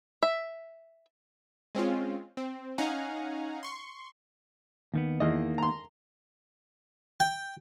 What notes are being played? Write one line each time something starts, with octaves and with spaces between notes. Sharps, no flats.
E5
G#3 C4 C#4 F4
C4
C#4 D#4 F5 F#5 G#5 A#5
C6 C#6
D#2 D#3 B3
E2 D#3 A#3 D#5
A#5 C6
G5